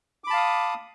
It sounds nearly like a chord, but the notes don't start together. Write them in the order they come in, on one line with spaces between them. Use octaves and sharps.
D6 B5 A5 F5 D#6